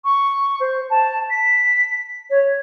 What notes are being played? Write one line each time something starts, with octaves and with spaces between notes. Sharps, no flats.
C#6
C5
A5
B6
C#5